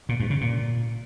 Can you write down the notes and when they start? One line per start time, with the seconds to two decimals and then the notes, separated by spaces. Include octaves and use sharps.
0.09 A#2
0.20 G2
0.30 C#3
0.41 A#2